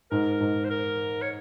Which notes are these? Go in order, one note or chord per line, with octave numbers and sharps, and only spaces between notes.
G#2 A#4
G#2
C5
A#4
C#5